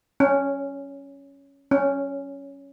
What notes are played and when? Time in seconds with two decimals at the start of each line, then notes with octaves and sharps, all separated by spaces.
0.20 C#4
1.71 C#4